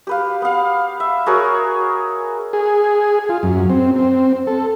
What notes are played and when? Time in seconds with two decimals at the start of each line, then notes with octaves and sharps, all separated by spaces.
0.07 G4 B4 F5
0.42 B3 F5
1.00 E5
1.26 F#4 G#4 A#4 C#5
2.53 G#4
3.29 F4
3.43 F#2
3.70 C4
3.96 C4
4.47 A4